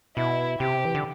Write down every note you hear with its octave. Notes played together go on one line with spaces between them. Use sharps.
B2 E4
C3 G4
E3
D3